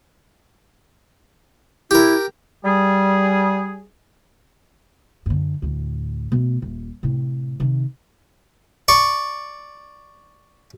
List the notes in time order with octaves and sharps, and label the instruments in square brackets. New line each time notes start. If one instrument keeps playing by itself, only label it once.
[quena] E4 [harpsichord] G4 A#4
[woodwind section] G3 G#4
[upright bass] F#2 D3
D2 A2
B2 A3
D#1
A2 C3
C3 D#3
[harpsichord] D5 C#6